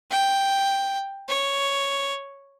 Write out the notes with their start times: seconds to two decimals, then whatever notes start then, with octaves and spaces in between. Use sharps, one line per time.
0.11 G5
1.29 C#5